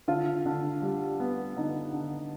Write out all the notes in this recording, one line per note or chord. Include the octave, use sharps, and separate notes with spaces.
D3 F4
D3
G3
B3
D3 D#4
D3